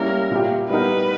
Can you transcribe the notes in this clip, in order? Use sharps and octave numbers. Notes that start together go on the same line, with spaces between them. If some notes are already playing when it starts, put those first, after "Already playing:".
Already playing: G3 A#3 C#4 E4 A#4
A#2 A#3 E4 G4
G3 B3 D#4 A#4 B4